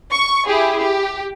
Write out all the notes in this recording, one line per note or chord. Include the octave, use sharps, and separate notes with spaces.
C#6
E4 G4 G#4
G4